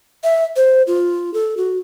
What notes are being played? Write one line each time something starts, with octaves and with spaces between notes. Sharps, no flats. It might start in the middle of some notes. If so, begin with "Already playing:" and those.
E5
C5
F4
A4
F#4